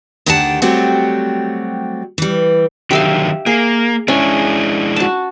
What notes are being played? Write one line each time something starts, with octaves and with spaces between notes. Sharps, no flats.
D2 D#3 D4 G4 F#5 A5
F#3 G3 A3 C4 F#4 G4
E3 G3
D3 D#3 F#3 G4 E5 F5
A#3 G#4
G#3 C#4 D4 E4
F#4 A5